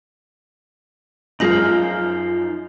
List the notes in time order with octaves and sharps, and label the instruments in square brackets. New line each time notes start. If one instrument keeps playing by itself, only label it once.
[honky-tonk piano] F#2 F3 [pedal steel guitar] D#4 F5 [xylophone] G#4 A#6 F#7